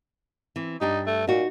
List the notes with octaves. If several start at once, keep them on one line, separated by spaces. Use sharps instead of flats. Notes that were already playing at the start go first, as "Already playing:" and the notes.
E3 C4
G2 D4 D#4 G4
A3
A#2 D#4 F#4